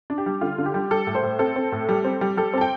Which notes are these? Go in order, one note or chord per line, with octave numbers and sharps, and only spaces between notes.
D4
G4
G3
D3 F4
D3
G4
G3
G3 A4
A2
C5
A2
C4 A4
C4
A2
G3
C4
G3
G3 A4
C4 A5
G5